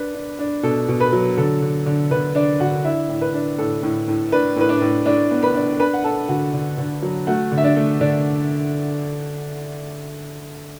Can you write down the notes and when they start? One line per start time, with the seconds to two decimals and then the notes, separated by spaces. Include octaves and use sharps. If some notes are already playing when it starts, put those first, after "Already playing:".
Already playing: D4 B4 B5
0.14 D4
0.39 D4
0.63 B2 A4
0.88 B2
1.00 B4 B5
1.13 F#3
1.37 D3 A4
1.62 D3
1.86 D3
2.11 D3 B4
2.35 D4 D5
2.60 D3 F#4 F#5
2.85 D4 E4 E5
3.09 A2
3.21 B4
3.34 D4
3.58 A2 A4
3.83 A2
4.08 A2
4.32 D4 B4
4.56 A2 B4
4.69 D4 D5
4.81 A2
5.06 A2 D4 D5
5.31 B3
5.43 B4 B5
5.55 D4
5.79 D4 B4 B5
5.94 F#5
6.04 D4 A4 A5
6.29 D3 F#4 F#5
6.54 D3
6.78 D3
7.02 F#3
7.27 A3 F#4 F#5
7.52 D3
7.58 E5
7.64 D4 D5
7.76 A3
8.01 D3 D4 D5